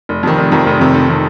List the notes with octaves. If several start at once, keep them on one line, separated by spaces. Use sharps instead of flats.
F1
F2 C3 D#3
F1
F2 C3 D#3
F1
F2 C3 D#3
F1
C3 D#3